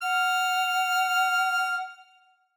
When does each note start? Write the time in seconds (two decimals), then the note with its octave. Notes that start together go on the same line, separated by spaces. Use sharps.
0.02 F#5 F6